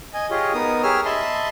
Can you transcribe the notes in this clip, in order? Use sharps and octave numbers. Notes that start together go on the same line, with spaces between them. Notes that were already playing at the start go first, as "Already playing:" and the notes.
D#5 G#5
F4 G4 G#4 C#5 D#5
B3 D#4 A#4 D#6
G4 G#4 C#5 E6 F6
D#5 E5 A5 B5 C6